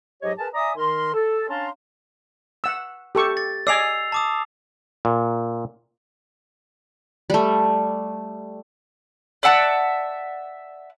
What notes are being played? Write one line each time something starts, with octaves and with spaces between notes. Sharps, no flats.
G#2 F#3 G4 C#5 D#5
G#4 A#4 B4 A5
D5 E5 G#5 A#5 D#6
D#3 A#4 C6
A4
C#4 D4 F5 A5 A#5 C6
F#5 E6
G4 A4 C#6
A6
D5 D#5 G#5 E6 C7 F7
A5 D6 D#6
A#2
G3 A3
D5 E5 F#5 A5